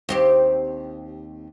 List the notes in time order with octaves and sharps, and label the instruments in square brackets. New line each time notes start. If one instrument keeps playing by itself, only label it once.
[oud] D#2 C4 G4